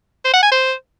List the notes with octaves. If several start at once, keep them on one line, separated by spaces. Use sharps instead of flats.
C5
F#5
G#5
C5